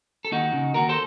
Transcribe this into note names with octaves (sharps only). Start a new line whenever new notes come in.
A4
D#2 D#4 F#4
C#3
D#2 F#4 A#4
A4 C5